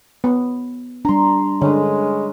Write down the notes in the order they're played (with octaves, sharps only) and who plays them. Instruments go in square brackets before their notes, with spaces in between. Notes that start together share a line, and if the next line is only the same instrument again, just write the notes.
[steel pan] B3
[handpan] G3 D4 [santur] A#5 C6
[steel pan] D3 [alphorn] G#3 [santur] C#4 B4